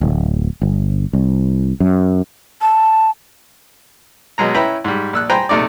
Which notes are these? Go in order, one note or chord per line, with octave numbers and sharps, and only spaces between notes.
D1
G1
C2
F#2
A5
B2 F#3 G#3 A#5
C#4 E4 B4 G5 A#5 B5
G#2 G3
A#1 E6 F#6
C5 G5 G#5 A#5 B5
A#1 C3 A3 D#4 D5